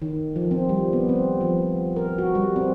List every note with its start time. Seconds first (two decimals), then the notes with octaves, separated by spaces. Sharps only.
0.02 D#3
0.36 F3
0.51 C4
0.69 G3
0.93 B3
1.09 C4
1.41 F3
1.96 A#4
2.18 F#4
2.35 G3
2.56 C4